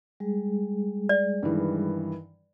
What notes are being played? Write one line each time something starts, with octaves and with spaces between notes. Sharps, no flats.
G3 G#3 G#4
D5
G2 D#3 E3